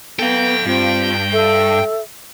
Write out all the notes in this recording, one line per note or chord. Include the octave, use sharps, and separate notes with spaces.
B3 A4 F5 G5
G2 C4 F4
A4 E5